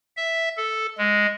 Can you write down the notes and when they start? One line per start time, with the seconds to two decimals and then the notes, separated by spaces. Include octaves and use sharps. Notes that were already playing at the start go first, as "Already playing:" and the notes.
0.17 E5
0.57 A4
0.98 G#3